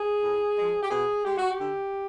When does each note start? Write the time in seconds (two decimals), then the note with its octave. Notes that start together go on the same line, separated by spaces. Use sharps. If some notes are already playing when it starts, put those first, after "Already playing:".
Already playing: G#4
0.21 A2
0.56 F3 G#3
0.82 G4
0.90 B2 G#4
1.25 G#3 G4
1.38 F#4
1.51 G4
1.60 D3